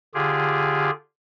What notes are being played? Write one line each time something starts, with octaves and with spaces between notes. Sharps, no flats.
D3 F4 G4 G#4